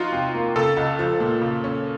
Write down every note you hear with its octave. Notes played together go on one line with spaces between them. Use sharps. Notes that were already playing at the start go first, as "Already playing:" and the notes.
Already playing: F3 D#4 F4 F#4
C3
A#3
C#3 A4
C#2
F3
A#2
C#3
C#4